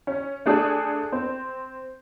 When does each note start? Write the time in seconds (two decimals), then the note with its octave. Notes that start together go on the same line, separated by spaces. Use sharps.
0.07 C#4
0.46 A3 D4 G#4 A4
1.12 C4